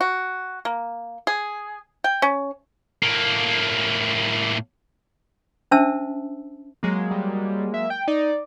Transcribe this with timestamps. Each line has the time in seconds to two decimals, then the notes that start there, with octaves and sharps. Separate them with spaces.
0.01 F#4
0.65 A#3
1.27 G#4
2.04 G5
2.22 C#4
3.03 A2 A#3
5.71 C#4 D4 C5 E5 A5 E6
6.83 F#3 G#3 A#3
7.11 G3
7.74 E5
7.90 G5
8.08 D#4 D5